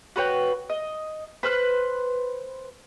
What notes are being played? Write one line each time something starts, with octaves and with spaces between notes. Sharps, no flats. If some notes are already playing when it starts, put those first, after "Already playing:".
F#4 B4 C#5 G5
D#5
B4 C5 F6 F#6